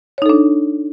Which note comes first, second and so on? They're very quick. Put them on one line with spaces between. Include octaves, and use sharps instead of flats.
C#5 D#4 A4 D4